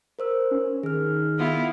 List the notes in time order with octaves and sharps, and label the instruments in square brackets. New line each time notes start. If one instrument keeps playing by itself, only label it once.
[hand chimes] A#4 C5 E6
[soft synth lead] C#4
[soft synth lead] D#3 [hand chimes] G#4 F6
[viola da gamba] B3 E4 F4